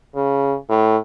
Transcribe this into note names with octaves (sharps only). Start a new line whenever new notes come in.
C#3
A2